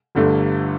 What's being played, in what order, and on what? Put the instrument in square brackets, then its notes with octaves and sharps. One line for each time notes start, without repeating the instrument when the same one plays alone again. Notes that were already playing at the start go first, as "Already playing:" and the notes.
[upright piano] G1 G2 D3 A3